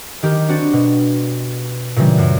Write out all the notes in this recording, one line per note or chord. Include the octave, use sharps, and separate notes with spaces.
D#3 G4 A#4
C4 D4 F#4 A6
B2
A#2 C#3 E3 G3
F#2